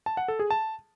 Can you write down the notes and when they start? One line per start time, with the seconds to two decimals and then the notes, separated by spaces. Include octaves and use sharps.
0.06 A5
0.17 F#5
0.28 A4
0.39 G#4
0.51 A5